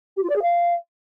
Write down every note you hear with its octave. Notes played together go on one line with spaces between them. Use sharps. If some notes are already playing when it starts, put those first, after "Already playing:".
G4
F4
D5
G#4
F5